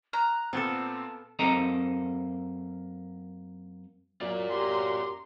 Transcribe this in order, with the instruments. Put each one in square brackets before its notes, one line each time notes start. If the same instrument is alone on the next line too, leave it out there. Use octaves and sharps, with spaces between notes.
[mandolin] A#5 [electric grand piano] F6 [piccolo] F#6
[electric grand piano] A#2 C4 [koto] B3 A4 [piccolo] A5
[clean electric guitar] F#2 A#3 C4 A4 D#5 A#5
[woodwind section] F#2 [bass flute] F#3 [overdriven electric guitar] F4 D5
[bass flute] G4 [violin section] A#5 C6